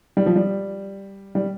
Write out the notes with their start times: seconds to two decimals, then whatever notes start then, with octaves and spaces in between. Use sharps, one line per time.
0.17 G3
0.26 F3
0.36 G3
1.35 G3